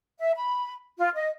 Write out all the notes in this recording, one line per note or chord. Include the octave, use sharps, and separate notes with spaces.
E5
B5
F4
D#5